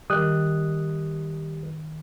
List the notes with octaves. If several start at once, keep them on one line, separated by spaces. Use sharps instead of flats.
D#3 G3 A#4 D#6 F#6